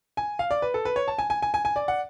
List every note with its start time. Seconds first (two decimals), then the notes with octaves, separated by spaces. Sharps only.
0.17 G#5
0.39 F5
0.51 D5
0.62 B4
0.74 A4
0.85 B4
0.96 C#5
1.08 A5
1.18 G#5
1.30 G#5
1.42 G#5
1.54 G#5
1.65 G#5
1.76 D5
1.88 F#5